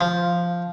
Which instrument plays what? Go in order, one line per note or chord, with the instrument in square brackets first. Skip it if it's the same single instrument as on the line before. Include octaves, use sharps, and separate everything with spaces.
[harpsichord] F3